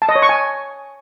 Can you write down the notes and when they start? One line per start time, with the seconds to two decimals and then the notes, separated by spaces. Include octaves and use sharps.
0.02 A5
0.09 D#5
0.15 C#5
0.22 C#6
0.29 G#5